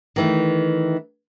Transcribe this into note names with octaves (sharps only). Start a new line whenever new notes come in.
D#3 E3 A3